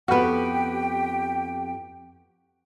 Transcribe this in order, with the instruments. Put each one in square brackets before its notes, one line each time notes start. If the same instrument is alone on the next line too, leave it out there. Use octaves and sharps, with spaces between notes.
[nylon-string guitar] F2 B3 [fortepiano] F#4 B4 [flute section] G4 G5